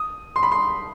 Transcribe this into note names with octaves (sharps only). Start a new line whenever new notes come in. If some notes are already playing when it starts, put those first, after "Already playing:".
Already playing: D#6
C6
B5
C6